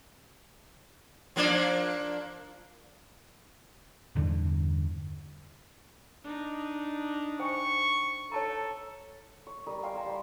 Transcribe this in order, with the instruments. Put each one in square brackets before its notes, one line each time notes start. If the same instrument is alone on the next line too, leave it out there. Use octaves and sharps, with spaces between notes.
[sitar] F3 A#3 D4
[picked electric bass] E2 G2 D3
[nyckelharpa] D4 D#4
[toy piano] C5 G5 G#5 [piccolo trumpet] C#6
[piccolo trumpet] A4 [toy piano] C#5 A5 A#5
[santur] C#5
G3 A#4 D#6
F5 G5 G#5 C6
C5 G5 A#5
G3 C#6